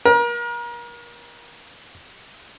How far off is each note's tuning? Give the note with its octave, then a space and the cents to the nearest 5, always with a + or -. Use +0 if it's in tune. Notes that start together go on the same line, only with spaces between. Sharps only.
A#4 +35